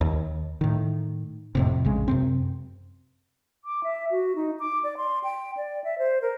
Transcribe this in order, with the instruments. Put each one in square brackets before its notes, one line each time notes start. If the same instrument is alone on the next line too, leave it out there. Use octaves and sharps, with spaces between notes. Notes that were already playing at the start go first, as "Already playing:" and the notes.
[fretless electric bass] D#2
A2 D#3
F2 A2 C3
A#1 C#3 G#3
F#2 C3 C4
[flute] D6
E5
F#4
D#4
D6
D5
C6
G5
D5
E5
C5
A#4